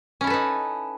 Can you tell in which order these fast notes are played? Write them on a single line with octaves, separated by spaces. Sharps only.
C#4 E4 A4 B4 D#4